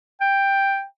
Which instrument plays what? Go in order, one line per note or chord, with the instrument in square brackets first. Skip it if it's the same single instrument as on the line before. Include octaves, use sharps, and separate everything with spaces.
[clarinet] G5